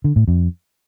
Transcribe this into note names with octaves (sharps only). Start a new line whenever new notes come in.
D3
A2
F2